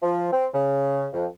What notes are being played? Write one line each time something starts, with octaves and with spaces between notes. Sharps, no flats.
F3
C4
C#3
F2